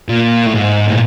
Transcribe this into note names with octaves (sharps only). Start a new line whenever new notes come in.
A#2
A2
G#2
A#2